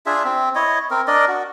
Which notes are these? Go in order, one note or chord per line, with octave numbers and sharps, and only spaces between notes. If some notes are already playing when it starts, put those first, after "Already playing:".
D4 F4 G#4 E5
C4
E4 C#5 D#5
C4 A#4
D4 A#4 D5 D#5
F#4